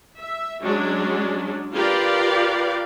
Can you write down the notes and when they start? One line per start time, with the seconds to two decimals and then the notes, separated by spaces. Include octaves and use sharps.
0.17 E5
0.61 F#3 G#3 C#4 D4
1.73 F4 G4 A#4 B4 D5 F5